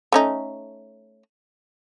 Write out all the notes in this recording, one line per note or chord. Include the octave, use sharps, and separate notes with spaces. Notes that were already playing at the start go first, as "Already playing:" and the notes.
A3 C#4 D#4